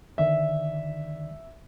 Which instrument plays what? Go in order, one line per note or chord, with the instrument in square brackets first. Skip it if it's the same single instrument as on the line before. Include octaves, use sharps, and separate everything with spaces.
[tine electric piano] D3 D#3 D5 [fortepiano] E5